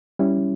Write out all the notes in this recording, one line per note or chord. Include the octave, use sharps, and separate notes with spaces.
G3 C#4 E4